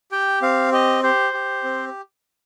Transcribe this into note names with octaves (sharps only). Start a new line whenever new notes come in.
G4 G5
C4 F5
G4 D#5
G4 C5
G4
C4